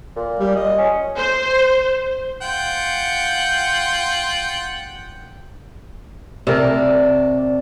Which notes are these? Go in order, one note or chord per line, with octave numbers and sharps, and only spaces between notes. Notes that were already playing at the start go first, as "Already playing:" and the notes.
A#2
G3
D#5
C#4
C5
F4 F#5 G5
C3 D4 A#4